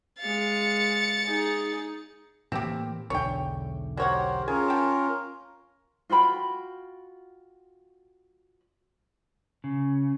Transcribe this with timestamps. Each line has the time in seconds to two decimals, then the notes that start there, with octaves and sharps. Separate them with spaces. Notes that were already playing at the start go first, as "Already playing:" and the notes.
0.19 G#3 F5 A6 C#7
1.25 D#4 G#4
2.52 A2 E3 A#3 C4 G4
3.10 B1 E2 D3 C#5 G5
3.97 F#3 G4 A#4 C5 C#5 F#5
4.48 C#4 F4 G#4 A#4
4.68 G5 A5
6.10 F4 F#4 G5 B5
9.64 C#3